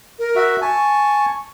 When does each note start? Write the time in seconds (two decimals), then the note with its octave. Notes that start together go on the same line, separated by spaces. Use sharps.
0.19 A#4
0.36 F#4 E5
0.61 G#5 A5 C#6